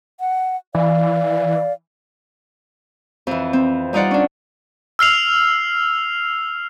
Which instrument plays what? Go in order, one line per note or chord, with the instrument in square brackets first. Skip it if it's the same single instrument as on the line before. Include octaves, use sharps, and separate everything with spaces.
[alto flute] F#5
[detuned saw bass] E3 [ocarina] D5 [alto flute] F5
[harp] F2 E3
C4
G3 D#4 F4 D5 F#5
C#4 D4
[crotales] E6 F6 C7 F7